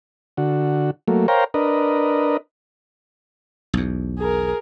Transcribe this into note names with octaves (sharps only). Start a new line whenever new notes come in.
D3 F#4
F#3 A3 A#3
A#4 C5 C#5 F5 G5 A#5
D4 A#4 B4 D#5
B1 E2
G#4 A#4